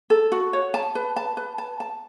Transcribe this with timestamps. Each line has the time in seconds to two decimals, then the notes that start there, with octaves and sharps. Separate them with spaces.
0.10 A4
0.32 F#4
0.53 C#5
0.74 A5
0.95 B4
1.16 A5
1.37 B4
1.58 A5
1.80 A5